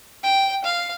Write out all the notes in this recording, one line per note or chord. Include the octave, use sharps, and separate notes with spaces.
G5
F5